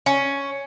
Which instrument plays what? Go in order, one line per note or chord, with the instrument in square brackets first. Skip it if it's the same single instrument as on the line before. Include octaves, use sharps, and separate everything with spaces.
[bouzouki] C#4